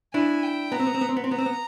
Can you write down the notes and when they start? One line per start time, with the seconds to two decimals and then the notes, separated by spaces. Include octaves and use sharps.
0.14 D4 E4 G#5
0.43 G5
0.72 B3 A#5
0.80 C4
0.87 B3
0.94 C4
1.01 B3
1.09 C4
1.17 B3
1.24 C4
1.30 B3 A#5
1.38 C4
1.46 B3